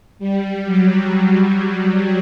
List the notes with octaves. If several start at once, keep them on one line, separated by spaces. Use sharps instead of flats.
G3
F#3
F#3